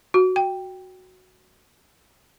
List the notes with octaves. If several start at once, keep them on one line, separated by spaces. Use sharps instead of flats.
F#4
G5